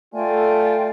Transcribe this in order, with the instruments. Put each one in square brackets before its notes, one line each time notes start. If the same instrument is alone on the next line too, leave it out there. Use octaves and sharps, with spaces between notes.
[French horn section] A3 [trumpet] F4 [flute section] D5 G5 G#5